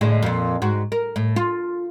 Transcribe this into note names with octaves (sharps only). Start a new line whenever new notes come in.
A2 D3 G#3
F2 A#2
G#2 F#4
A#4
A2
F4